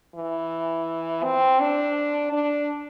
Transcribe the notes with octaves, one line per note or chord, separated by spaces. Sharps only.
E3
C4
D4
D4